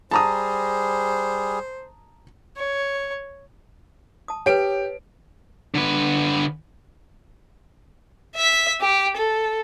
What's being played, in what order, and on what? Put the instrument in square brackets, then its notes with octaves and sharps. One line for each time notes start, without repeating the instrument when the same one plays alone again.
[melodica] G3 G#4 [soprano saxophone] C5 [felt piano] A5 A#5 D#6
[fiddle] C#5
[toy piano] A5 D#6
[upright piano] G4 D7 [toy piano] B4 C#5
[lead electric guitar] D3 B4
[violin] E5 B6
G4
A4